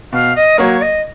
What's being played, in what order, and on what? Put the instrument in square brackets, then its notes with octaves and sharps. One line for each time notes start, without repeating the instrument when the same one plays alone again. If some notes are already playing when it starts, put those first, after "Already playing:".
[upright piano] B2 [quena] F5
[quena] D#5
[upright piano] F#3 A#3 [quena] C#5
[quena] D#5